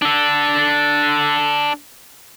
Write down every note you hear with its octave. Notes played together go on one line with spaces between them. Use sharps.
D4 A4